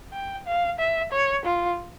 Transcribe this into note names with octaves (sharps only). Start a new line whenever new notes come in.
G5
F5
E5
C#5
F4